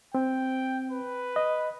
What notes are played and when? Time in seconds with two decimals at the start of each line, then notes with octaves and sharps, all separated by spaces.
0.15 C4 G5
0.91 B4
1.36 D#5